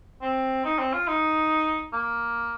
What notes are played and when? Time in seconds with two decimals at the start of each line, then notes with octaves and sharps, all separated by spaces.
0.22 C4
0.65 D#4
0.79 C4
0.93 F4
1.08 D#4
1.93 A#3